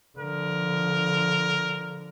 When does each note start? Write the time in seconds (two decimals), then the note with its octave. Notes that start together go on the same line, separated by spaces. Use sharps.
0.18 D3 F3 A#4